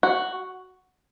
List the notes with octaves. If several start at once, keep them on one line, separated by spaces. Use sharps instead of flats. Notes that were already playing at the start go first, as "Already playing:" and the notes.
F#4